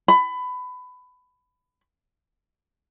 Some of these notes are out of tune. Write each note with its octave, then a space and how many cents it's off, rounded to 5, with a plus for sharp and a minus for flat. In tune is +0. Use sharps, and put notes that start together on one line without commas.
B5 +20